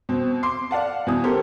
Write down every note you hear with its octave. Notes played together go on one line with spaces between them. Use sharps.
B2 C4
C6 D6 C7
D5 F5 F#5 A5
B2 E3 D#6
C#4 G4 A4 A#4 C5 C#5